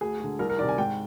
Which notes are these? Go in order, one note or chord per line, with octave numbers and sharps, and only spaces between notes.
D2 G#4
D3 G#3
C2 A#4
A#4
C3 D#3 D5
G#5
G#2 G5